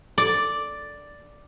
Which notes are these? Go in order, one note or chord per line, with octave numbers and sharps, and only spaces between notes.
D5